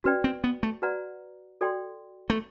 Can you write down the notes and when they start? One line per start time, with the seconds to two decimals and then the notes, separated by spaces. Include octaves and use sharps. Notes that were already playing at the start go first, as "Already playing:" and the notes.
0.04 C#4 F#4 B4 D5 G5
0.24 C4
0.44 B3
0.63 A3
0.82 F#4 B4 D5 F#5 A#5
1.61 F#4 A4 D5 G5 C6
2.30 A3